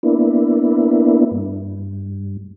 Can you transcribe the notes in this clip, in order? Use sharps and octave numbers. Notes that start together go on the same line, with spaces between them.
A#3 B3 D4 E4
G2